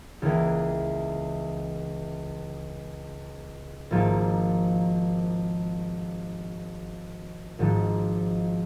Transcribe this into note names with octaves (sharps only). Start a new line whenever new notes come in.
C#2 C#3 E3 A#3
G#1 G#2 F3 A#3 F4
G#1 G#2 F3